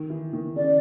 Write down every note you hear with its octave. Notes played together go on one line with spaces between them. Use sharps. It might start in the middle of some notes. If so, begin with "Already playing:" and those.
Already playing: D#3
E3
D#3
C#3 D5